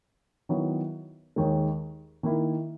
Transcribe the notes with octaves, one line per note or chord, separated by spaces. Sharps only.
D#3 F#3 B3 E4
D#2 D#3 G#3
D#3 A#3 E4